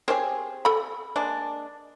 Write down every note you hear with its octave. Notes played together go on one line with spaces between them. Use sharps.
C4 G4 G#4 A#4 C5 C#5
A4 B5
G#3 A#3 D4